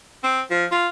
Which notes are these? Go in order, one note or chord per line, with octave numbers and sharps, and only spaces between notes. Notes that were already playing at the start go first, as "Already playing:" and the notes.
C4
F3
F4